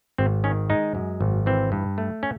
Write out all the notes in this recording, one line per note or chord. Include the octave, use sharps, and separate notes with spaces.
G#1 C4
D#3 C#4
G#3 D#4
F#2
G#1
E3 C4
G2
A3
C#4